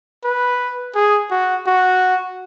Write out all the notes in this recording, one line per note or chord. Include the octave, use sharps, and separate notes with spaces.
B4
G#4
F#4
F#4